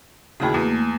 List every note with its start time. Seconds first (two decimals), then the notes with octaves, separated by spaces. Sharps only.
0.40 D#2 A2 C#3 F#4 G#4 B5
0.54 E2 A3 A#3